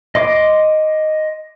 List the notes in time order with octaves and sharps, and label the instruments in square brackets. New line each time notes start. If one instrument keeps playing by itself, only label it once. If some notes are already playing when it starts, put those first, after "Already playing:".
[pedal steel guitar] D#5 C6 D6